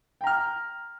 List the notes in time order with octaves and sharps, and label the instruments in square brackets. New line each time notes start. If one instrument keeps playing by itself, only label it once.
[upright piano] G5
A#5
F6